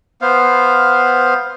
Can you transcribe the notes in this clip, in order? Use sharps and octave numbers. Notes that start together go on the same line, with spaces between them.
B3 C5 F5